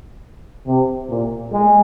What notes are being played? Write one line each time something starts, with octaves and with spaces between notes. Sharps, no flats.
C3
A#2
G#3